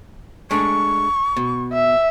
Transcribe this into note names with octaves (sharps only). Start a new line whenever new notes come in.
G#3 A3 D4 C#6
B2
E5